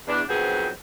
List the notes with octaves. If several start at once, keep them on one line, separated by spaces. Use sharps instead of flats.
E2 D4
F2 D#3 F#3 B3 G#4 C5